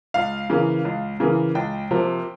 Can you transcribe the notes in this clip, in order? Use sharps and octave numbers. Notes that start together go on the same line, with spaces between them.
C#2 F5
C#3 E3 A#3
C#2
C#3 E3 A#3
C#2 G5
C3 F3 A#3